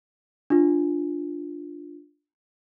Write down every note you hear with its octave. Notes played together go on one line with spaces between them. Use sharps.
D4 F4